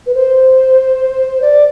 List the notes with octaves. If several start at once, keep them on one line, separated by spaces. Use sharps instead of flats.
B4
C5
D5